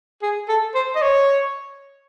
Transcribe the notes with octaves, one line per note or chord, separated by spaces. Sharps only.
G#4
A4
C5
D#5
C#5